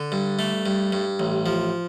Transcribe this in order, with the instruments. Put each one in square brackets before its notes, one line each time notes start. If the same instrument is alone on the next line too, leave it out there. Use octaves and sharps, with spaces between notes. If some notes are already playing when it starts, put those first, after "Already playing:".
Already playing: [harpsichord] D3
G2
A3
G2
G2
A1
F3